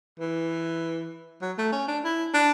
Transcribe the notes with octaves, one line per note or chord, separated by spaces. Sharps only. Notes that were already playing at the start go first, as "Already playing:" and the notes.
E3
F#3
A3
C#4
D4
E4
D4